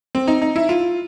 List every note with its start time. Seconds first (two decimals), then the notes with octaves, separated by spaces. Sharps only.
0.15 C4
0.28 D#4
0.42 D#4
0.56 E4
0.69 F4